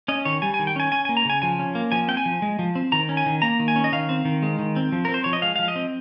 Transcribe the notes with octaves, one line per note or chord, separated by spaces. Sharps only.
C#4 D#5
D#3 C#5
G3 G#5
G#5
D#3
G5
C#4 G#5
C#4 G#5
G#5
A#3
A#5
C#3 G#5
F3 G#5
C#4
A#3
F3 G#5
C4 G5
G#5
F3
G#3
F3
C4
D#3 A#5
C#4
G#5
D#3
A#3 A#5
D#3
G#5
C#4
D#5
D#3 F5
C4
D#3
G#3
D#3
C4
F3
C4 A#4
C5
F3 C#5
D#5
G#3 F5
F3 F5
D#5
C4